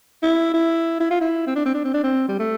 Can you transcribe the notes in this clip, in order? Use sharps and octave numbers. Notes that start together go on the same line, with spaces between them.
E4
E4
E4
F4
E4
C4
D4
C4
D4
C4
D4
C4
G3
A3